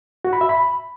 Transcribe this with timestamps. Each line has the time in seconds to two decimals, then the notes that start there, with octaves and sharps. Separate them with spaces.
0.25 F#4
0.33 B5
0.41 E5
0.49 B5